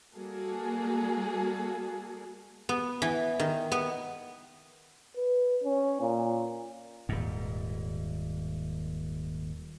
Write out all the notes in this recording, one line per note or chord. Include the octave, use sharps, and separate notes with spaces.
G3 A#3 F#4 G#4 A4
B3
E3
D#3
B3
B4
C#4
A#2
D#1 G#2